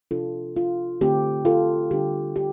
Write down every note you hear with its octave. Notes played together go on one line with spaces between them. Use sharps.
C3 F3 D4 F4 A4
F4
D3 A3 C4 G4
F4 A4
D3 G3 D4 G4
G4